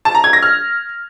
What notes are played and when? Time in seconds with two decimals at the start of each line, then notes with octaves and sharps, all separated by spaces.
0.05 A5
0.15 A#5
0.24 G#6
0.33 A#6
0.43 F6